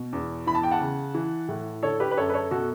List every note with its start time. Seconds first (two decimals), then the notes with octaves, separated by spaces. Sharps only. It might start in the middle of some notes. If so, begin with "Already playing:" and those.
Already playing: B2
0.13 E2
0.47 E3 B5
0.55 A5
0.63 G5
0.71 F#5 A5
0.80 C#3
1.14 E3
1.49 A2
1.83 D3 A4 C#5
2.00 G4 B4
2.11 B4
2.17 F#2 A4 C#5
2.30 B4
2.34 A4 C#5
2.51 B2 F#4 A4